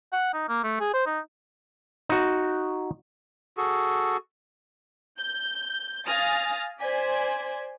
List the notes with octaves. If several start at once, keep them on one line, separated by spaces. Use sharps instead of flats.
F#5
D#4
A#3
A3
G#4
C5
D#4
D#4 F#4
F#4 G#4 A4
G6
F5 G#5 D#6 F6 A6 A#6
C5 D5 G#5 G#6 B6